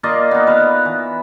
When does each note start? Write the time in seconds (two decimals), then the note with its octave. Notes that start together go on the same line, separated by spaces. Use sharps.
0.03 A#3 F4 D5 D#5
0.31 B3 D#4
0.47 B4 F5 F#5
0.85 E3